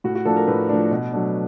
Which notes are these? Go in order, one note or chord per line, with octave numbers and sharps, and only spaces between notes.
A2 F#4
F#4
F3 A3 D4 A4
A#4
A2 B4
F3 A3 D4
B2
F#3 A3 D4